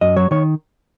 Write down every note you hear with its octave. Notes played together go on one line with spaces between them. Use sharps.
F#2 D#5
F#3 C#5
D#3 C#5